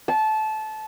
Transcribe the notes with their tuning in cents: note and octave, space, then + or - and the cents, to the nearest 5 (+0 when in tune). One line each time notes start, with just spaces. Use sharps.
A5 -20